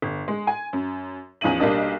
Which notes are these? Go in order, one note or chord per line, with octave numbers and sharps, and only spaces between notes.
G1
G#3
G#5
F#2
E2 F3 C#4 D#4 D#7 F#7
B1 G3 A#3 D4 D#5